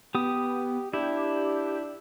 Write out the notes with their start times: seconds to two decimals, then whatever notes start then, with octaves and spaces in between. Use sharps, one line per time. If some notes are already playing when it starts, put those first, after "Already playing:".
0.15 B3 G4 D#6
0.93 D4 E4 G4